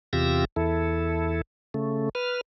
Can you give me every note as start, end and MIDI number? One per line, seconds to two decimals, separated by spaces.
0.13 0.45 40
0.13 0.45 48
0.13 0.45 65
0.13 0.45 67
0.13 0.45 88
0.13 0.45 94
0.56 1.41 40
0.56 1.41 64
0.56 1.41 69
1.74 2.09 49
1.74 2.09 57
2.15 2.41 71
2.15 2.41 89